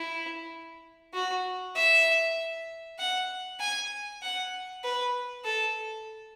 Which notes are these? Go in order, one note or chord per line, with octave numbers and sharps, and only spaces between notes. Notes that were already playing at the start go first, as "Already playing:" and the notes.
Already playing: E4
F#4
E5
F#5
G#5
F#5
B4
A4